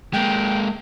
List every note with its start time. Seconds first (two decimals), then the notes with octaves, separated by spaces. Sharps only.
0.13 G#3 A#3 G5